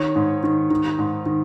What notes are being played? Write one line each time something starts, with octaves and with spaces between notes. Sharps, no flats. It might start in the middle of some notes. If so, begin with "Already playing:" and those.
Already playing: D#3 C#5
G#2
D#3
D#3
G#2
D#3